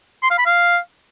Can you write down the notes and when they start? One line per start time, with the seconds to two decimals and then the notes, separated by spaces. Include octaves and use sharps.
0.23 C6
0.30 F5
0.38 B5
0.46 F5